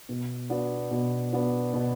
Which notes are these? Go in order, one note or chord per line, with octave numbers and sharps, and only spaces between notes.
B2
B3 D4 F#4
B2
B3 D4 F#4
B2